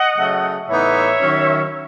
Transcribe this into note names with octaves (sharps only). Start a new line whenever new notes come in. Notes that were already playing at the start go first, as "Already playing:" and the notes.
Already playing: D#5 F#5
C#3 F#3 A3
A2 E3 B3 D#4 C#5 E5
D#3 F#3 C#4